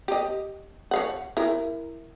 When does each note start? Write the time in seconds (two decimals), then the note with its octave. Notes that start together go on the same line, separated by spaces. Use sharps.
0.08 G4 D#5
0.91 C#5 F5 F#5
1.37 E4 A#4